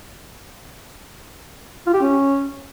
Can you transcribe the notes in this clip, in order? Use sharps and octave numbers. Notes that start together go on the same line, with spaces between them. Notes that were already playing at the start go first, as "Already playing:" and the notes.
F4
G4
C#4